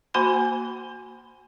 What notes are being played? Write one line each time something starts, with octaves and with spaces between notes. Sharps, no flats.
A#3 F#4 C5 G#5 B5 C6